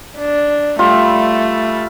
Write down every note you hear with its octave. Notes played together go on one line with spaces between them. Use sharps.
D4
G3 A3 F4 E5